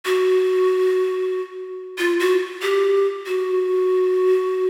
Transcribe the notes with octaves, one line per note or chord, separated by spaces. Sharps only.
F#4
F4
F#4
G4
F#4